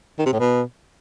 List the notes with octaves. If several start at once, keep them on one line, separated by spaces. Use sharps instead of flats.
D#3
C3
A2
B2